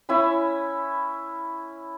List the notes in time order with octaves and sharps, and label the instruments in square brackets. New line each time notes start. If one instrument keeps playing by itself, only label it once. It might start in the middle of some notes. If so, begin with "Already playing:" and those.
[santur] C#4 E4 G#5 B5